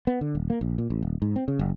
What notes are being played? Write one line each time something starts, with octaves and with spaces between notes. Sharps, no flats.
B3
D3
D#1
A#3
A#1
A#2
A1
D#1
G#2
C4
C#3
F#1